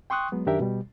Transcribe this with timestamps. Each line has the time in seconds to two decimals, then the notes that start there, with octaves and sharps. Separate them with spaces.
0.10 G5 C6 C#6 D#6 F#6
0.32 F#3 G#3 B3
0.46 F#2 D#3 D4 G4 A#4 E5
0.60 B2 G3